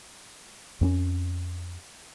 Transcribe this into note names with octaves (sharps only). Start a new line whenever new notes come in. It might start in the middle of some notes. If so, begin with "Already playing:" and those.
F2 C4 C#4